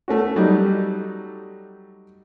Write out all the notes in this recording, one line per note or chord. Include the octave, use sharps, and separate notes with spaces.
A3 C#4 F#4
F#3 G3 A3 D#4 G4